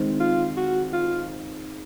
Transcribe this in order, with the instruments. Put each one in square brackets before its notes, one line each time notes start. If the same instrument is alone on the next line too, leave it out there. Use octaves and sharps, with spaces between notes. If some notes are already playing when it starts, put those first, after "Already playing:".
Already playing: [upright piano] D#3 G#3 C4
[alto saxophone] F4
F#4
F4